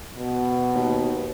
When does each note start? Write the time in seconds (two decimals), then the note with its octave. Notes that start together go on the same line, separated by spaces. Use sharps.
0.17 B2
0.75 D#2